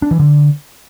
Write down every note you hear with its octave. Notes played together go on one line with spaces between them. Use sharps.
D4
E3
D3